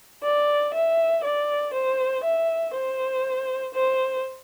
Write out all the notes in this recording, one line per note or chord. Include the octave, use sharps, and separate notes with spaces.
D5
E5
D5
C5
E5
C5
C5